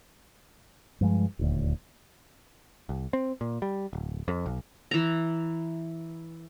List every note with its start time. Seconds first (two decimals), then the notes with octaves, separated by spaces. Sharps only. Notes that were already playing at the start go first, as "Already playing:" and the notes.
1.01 G2 F3 G#3
1.39 D#1 D2
2.89 C2
3.13 C4
3.41 A#2
3.62 G3
3.93 D1
4.28 F2
4.46 B1
4.91 E3 A#5